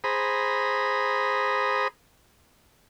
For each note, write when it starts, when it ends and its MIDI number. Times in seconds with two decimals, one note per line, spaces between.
0.04 1.88 68
0.04 1.88 72
0.04 1.88 82
0.04 1.88 83
0.04 1.88 87